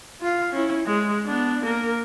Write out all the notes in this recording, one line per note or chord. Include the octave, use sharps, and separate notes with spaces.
F4 F5
C#4 E4
G#3
B3 D4
A#3 A#4